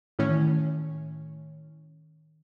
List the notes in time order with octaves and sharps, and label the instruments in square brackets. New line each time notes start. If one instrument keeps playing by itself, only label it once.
[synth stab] A2 C#4 [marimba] D#3 E3